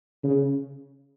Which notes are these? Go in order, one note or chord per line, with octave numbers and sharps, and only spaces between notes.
C#3